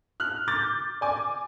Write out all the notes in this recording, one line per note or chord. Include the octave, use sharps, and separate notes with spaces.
F6 F#6
D6 G6 A6
D5 G#5 D6